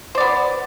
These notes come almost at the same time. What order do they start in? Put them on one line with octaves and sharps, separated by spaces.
C5 D5 B3